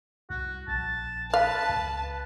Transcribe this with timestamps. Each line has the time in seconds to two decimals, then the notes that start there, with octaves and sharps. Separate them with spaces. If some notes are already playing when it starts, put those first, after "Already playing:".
0.30 C2 F#4
0.68 A#1 A5
1.34 B4 F5 A5
1.69 C#2